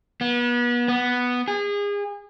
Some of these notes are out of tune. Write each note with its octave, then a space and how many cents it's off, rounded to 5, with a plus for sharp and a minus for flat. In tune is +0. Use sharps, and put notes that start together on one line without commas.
B3 -35
B3 +0
G#4 -30